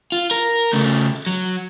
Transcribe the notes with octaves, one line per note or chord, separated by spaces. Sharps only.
F4
A#4
C#3 A3
F#3